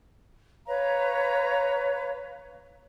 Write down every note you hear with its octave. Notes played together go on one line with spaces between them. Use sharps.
B4 C#5 F5 A#5